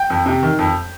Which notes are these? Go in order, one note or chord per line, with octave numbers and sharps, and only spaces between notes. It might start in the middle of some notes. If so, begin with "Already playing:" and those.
Already playing: G5
F2
C3
D#3
F2